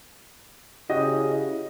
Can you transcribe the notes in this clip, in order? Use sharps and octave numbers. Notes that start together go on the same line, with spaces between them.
C#3 E4 F#4 G4 D#5